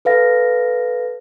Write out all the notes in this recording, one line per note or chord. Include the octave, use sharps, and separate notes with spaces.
A4 B4 F5 A#6